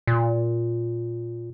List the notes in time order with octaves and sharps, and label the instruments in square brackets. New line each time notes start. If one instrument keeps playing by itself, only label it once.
[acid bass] A#2